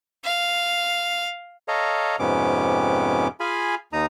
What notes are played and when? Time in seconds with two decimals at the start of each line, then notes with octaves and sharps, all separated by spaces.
0.24 F5
1.68 A4 C#5 D#5 F5 A#5
2.19 F2 G#2 C3 B3 C#4 D6
3.40 F4 G#4 F5 G#5 B5
3.93 D#2 D#4 A#5 D#6